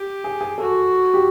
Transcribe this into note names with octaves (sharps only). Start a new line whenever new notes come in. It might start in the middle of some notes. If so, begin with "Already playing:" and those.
Already playing: G4
G#4
G#4
F#4 A4
G4